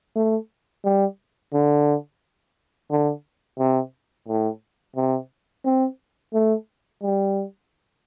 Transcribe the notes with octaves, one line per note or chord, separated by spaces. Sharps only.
A3
G3
D3
D3
C3
A2
C3
C4
A3
G3